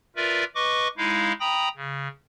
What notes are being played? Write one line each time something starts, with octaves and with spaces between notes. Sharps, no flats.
F4 A#4 B4 D5 E5
B4 D#5 C#6 D6
G#3 D#4 E4 F5
G5 A#5 B5 D#6 A#6
C#3